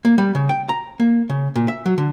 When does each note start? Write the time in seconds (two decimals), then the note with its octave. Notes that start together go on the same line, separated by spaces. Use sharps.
0.05 A#3
0.18 G3
0.35 C#3
0.49 G5
0.69 A#5
1.00 A#3
1.30 C#3
1.56 A#2
1.68 E5
1.86 F#3
1.98 D3